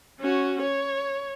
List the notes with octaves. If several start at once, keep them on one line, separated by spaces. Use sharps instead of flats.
C#4 F#4
C#5